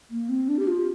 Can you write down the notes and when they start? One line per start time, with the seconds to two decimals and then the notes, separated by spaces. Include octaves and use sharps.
0.11 A#3
0.29 C4
0.48 D4
0.59 G4
0.68 F4